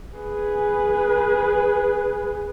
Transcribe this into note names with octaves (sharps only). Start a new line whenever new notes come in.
G#4 B4